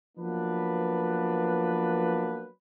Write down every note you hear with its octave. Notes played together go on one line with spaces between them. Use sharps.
F3 F#3 A#3 B3 D4 B4